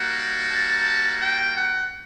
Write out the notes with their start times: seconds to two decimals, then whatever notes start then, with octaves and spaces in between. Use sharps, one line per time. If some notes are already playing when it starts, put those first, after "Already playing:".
Already playing: G3 A#3 D#4 F#4 F#5
0.51 A5
1.20 G5
1.55 F#5